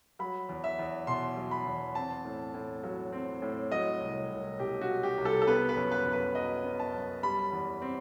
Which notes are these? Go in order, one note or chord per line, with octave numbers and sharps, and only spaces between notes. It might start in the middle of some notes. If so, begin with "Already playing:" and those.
F#3 B5
E2
E5
E2
B2 C6
F#3
B5
E2
C4 A5
A2
A2
F#3
C4
A2
F#3 D#5
C2
C2
B2 G4
F#4
F#3
G4
C2
A4
A4
B3 B4
B4
F#2
B4
F#2
B4
F#3 D#5
B3
A5
F#2
G3 B5
E2
C4